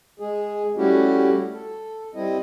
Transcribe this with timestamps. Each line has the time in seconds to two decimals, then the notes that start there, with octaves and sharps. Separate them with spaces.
0.20 G#3 G#4
0.77 G3 A3 C#4 E4 F#4 G4
1.53 A4
2.15 G3 C4 E4 D#5